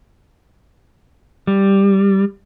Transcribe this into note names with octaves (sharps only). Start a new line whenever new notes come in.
G3